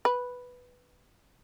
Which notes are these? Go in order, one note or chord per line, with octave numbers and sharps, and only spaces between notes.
B4